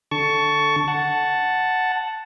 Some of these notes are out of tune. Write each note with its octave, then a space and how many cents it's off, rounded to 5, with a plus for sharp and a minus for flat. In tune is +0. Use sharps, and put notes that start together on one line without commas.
D3 +0 A5 +0 C#6 +15
F#5 +0 A5 +0